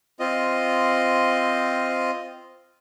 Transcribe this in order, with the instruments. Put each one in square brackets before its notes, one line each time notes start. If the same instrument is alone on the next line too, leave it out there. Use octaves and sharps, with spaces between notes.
[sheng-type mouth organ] C4 F4 D#5